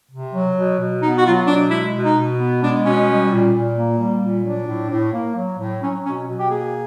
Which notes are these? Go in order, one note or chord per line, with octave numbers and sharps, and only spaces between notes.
C3
F#3
B2
B2
B3 D#4
F#4
F#3 F4
B2 D4
G#3 E4
B2
D#4
B2
B3
G#3 D4
B2 C#4
G3
A#2
A#2
A#3
G3
A#2
F#3 D4
A2
A2
A#3
F#3
A2
F#3 C#4
B2 C#4
B2
G4
A#3 G#4